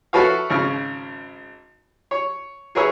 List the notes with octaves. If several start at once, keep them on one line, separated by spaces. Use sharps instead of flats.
E4 F#4 A4 B4 C#5 F5
G#1 C#3 C#6 F6
C#5
G#4 A#4 B4 C#5 E5